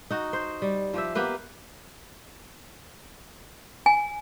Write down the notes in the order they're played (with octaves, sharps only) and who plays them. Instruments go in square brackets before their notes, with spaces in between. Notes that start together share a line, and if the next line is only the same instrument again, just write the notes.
[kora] D#4 F#4
C5
G3
F3 G4 E5
A#3 B3 G4 B4
[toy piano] G#5